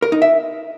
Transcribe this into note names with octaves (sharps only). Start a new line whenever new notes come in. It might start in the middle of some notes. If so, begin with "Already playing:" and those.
A#4
D#4
E5